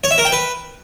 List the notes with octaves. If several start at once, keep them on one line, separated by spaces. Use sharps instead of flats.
C#5
E5
A#4
G5
B4